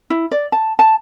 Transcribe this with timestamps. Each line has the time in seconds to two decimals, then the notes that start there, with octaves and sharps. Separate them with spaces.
0.10 E4
0.31 D5
0.52 A5
0.79 A5